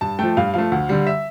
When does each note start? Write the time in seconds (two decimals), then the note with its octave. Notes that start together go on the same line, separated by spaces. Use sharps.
0.01 G2 A5
0.19 F3 A3 G5
0.37 G2 F5
0.54 F3 A3 F5
0.72 D2
0.89 D3 G3
1.07 E5